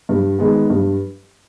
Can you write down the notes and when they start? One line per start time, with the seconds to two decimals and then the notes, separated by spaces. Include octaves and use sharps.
0.09 G2
0.39 D#3 G#3 B3
0.70 G2